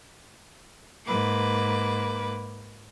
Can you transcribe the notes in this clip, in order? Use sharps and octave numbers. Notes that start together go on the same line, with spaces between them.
G#2 A#3 B4 D6